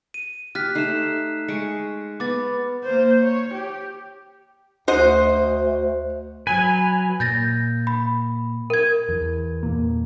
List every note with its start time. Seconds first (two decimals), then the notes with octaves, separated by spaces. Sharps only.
0.14 D#7
0.55 G4 F6 F#6 B6
0.75 A3 D#4 C7 E7
1.48 G#3 C#6 C#7 D7
2.20 B3 D6 A6
2.83 A#3 C5
3.22 C#5
3.54 G4
4.88 D2 F#4 C5 D#5
6.47 F#3 B4 G#5
7.20 A#2 G6 A6 A#6
7.87 B5
8.70 A#4 G#6
9.09 E2
9.63 E2 A#2 A#3